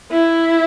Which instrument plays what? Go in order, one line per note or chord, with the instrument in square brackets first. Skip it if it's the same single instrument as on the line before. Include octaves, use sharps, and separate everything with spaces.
[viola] E4